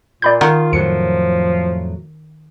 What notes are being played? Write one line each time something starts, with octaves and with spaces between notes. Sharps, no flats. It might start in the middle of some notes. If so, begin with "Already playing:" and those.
A#2 D5 B5 G6
D#3 F4 F#5
F2 A2 F3 F#3 C#7